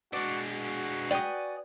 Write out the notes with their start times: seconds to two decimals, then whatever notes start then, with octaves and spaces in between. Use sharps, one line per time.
0.13 G#3 D4 F#4 D5 D6
0.51 F#4
1.11 B4 D5 G5 G#5 D#6